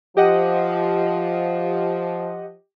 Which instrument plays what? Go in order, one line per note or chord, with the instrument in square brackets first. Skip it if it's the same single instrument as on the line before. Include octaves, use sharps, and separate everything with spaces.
[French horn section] F3 [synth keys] G4 D#5 F#5